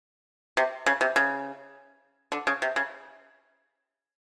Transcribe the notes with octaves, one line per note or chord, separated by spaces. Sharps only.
C3
C#3
C3
C#3
D3
C#3
C3
C#3